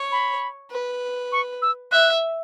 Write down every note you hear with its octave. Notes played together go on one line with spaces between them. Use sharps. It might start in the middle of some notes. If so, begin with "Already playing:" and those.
Already playing: C#5
B5
B4
C#6
E6
E5 F#6